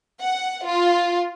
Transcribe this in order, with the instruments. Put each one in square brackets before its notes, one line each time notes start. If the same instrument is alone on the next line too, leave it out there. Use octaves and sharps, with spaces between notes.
[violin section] F#5
F4